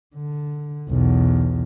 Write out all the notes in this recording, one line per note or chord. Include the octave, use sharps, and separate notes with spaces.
D3
B1 E2